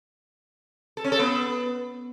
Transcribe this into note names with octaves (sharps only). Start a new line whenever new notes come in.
A4
C#4
A4
B3